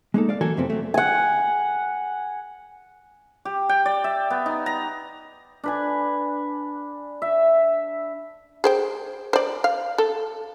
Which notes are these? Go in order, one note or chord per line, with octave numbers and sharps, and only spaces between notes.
G#3 A#3 D#4 A4
D5 F5
E3 F#3 A#3 F#4 A4 G#5
F2 C3 F3 B3 C4
F#3 A3
F#5 G#5
G4
G5
D5
E5
B3
D#4
A#5
D4 B4 G#5
E5
G#4 C5 G5
C5 D5
F5
A4